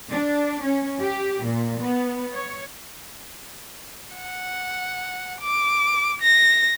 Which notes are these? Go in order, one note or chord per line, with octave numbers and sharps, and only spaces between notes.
D4
C#4
G4
A#2
B3
C#5
F#5
D6
A#6